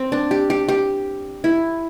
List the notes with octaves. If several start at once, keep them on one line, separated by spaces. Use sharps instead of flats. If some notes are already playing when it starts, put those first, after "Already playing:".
Already playing: C4
D4
G4
G4
G4
E4